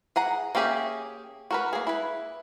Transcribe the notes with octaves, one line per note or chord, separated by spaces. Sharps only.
G#4 F#5 A#5
A#3 C#4 G4 G#4 E5
F#4 A#4 B4
A#3 G#4
E4 B4